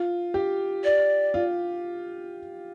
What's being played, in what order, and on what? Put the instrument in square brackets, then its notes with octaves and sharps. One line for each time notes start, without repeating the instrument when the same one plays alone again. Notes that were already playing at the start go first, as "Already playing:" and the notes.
Already playing: [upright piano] F4
G4
[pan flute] D5
[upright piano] F4